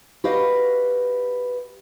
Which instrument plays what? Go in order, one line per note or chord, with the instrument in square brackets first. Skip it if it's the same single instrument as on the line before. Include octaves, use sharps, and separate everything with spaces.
[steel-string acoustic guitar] F#4 G4 B4 D#5 F5